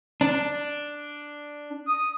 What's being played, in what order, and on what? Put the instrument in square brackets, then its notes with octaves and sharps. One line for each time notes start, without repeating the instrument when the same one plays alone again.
[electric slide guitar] D4
[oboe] D#6